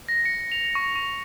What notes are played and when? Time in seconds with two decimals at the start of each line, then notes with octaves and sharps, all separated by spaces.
0.08 A#6
0.25 C#7
0.52 F7
0.75 C#6
0.95 C#6